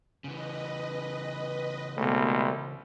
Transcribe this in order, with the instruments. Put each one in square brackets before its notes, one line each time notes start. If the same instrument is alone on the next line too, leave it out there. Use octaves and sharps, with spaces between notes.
[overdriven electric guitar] C#3 E3 [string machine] B4 D#5
[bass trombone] C2 [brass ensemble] B2 G#3 A3